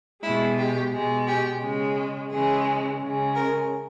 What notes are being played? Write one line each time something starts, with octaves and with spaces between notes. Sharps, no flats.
B2 G#3 E4
G4
B2 G#3
G4
C#3 G#3
C#3 E3 G#3 G#4
C#3 G#3
A#4